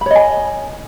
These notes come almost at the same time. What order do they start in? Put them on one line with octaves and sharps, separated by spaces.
B5 C#5 D#5 G#5